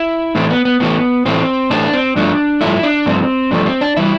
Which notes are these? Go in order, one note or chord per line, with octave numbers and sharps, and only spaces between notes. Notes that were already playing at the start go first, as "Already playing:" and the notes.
Already playing: E4
A2 E3 A3 C4
B3
B3
A2 E3 A3 B3
A2 E3 A3 C4
A2 E3 A3 D4
C4
G2 F3 A3 D4
G2 F3 A3 E4
D4
G2 F3 A3 C4
G2 F3 A3 D4
C4
D4
E3 G3 E4